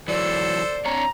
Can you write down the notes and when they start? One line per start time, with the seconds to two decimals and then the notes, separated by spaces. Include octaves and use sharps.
0.08 E3 F#3 A4 C5 D5 E6
0.85 C4 D4 C#5 A#5